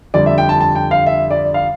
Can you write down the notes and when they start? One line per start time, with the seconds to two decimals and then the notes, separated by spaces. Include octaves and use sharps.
0.14 F2 D3 G3 D5
0.26 E5
0.38 G5
0.49 A5
0.60 A5
0.75 G5
0.91 F5
1.06 E5
1.30 D5
1.54 F5